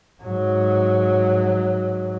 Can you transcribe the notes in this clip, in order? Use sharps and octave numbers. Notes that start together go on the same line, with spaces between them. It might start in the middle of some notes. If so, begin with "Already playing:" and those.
G#2 F#3